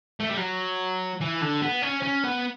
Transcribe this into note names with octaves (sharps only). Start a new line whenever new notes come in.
A3
G3
F#3
E3
D3
B3
C#4
C#4
B3